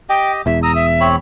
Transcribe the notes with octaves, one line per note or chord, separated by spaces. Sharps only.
G4 D#5 G5
E1 E2 E5
A#5 D#6 E6
E5
C4 C#5 B5